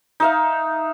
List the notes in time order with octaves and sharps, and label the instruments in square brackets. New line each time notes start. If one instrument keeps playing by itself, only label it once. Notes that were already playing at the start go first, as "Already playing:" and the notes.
[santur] D#4 E5 F5